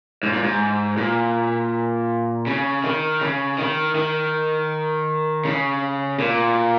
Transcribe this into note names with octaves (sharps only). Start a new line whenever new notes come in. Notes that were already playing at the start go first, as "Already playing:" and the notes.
G#2
A#2
G#2
A#2
C#3
D#3
C#3
D#3
D#3
C#3
A#2